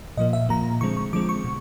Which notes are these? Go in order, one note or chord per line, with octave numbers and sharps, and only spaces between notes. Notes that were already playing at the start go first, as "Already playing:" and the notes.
A#2 F3 A#3 D#5
E5
A#2 F3 A#3 A#5
D3 F3 G#3 C4 C#6
C#6
D3 F3 G#3 C4 D6
C#6
B2